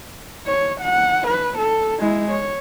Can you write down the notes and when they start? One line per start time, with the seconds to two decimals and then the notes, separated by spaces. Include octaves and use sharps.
0.47 C#5
0.81 F#5
1.28 B4
1.59 A4
2.00 G#3 E4
2.30 C#5